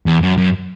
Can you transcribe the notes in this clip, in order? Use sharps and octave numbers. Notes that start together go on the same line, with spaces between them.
E2
F#2
F#2